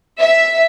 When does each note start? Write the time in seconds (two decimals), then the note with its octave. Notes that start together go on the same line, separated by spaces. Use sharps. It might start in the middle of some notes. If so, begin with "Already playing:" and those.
0.19 E5